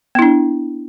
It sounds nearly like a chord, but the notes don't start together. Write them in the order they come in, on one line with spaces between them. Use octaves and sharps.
B3 E4 D4